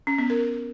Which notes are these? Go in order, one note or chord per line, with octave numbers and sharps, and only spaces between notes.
C#4
B3
A#4